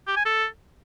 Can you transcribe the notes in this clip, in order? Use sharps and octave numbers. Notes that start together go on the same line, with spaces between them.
G4
G#5
A4